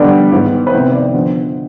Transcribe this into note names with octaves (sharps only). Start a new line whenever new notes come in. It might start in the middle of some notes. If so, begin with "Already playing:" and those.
Already playing: D3 G3 B3 D4 D5
G#2 D#3 B3
B4
C3 D#3 B3 C5
C5
D5
D3 F3 B3 C5